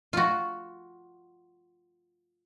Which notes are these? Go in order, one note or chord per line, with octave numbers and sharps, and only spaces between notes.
F4 F#4